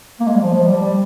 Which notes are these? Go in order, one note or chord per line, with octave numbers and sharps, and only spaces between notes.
A#3
G#3
G3
F3
F3
G3
G3